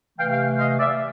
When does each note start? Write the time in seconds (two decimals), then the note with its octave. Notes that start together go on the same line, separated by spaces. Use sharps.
0.19 C3 E3 A3 F5 G5
0.32 F5 G5
0.59 D#5 F5
0.79 D5 E5